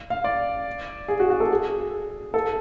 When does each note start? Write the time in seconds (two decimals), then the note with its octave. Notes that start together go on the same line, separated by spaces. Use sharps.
0.10 F5
0.24 D5
1.08 G#4
1.20 F#4
1.30 F#4
1.40 A4
1.51 G#4
2.34 A4